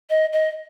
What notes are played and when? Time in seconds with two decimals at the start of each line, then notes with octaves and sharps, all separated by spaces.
0.10 D#5
0.33 D#5